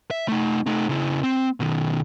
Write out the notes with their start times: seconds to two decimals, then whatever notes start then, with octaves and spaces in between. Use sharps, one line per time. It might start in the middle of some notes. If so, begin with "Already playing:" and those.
0.11 E5
0.28 A3 D#4
0.66 A3 D#4
0.89 C#3 E4
1.23 C4
1.60 B2 D#3